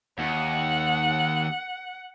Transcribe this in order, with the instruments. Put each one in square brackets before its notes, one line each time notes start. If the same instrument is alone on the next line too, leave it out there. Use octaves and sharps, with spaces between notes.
[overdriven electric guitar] D#2 [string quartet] F#5